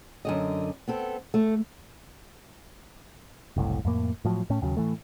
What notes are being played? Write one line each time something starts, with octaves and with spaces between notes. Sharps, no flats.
F#2 D3 D#5
B3 C4 A4
A3
F#1 C2 A2
F2 A2 A#3
A2 F3 F#3
A2 A3 C#4
D#2 C#3 F#3
A2 E3 A3